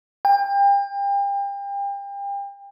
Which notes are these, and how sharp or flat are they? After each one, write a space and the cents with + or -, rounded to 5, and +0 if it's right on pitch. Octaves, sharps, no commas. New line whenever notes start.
G5 +35